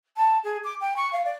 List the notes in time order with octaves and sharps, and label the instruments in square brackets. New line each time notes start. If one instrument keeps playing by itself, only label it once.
[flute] A5
G#4
D6
G5
C#6
F5
D5